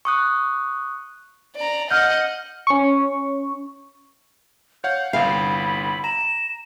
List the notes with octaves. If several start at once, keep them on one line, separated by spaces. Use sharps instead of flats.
C#6 D#6 F#6
D5 A#5
D#5 F#5 F6 G6
C#4 C#6
C#5 F5 F#5 G6
G1 C2 F5 G5 B5
A#5 E7